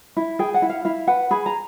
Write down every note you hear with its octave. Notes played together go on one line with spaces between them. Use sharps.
E4
G#4 G5
F#5
E4
F5
E4 F5
B4 F#5
G#4 B5
A#5